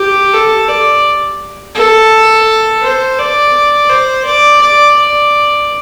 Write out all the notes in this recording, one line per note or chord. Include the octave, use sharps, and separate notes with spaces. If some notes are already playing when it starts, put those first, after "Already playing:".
Already playing: G4
A4
D5
A4
C5
D5
C5
D5
D5
D5